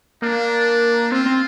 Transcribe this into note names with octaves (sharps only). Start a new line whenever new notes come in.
A#3 D4
C4 F4
C4